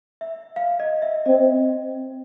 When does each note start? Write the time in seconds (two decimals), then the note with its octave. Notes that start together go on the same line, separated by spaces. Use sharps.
0.21 E5
0.56 F5
0.80 D#5
1.02 E5
1.26 C4 D#5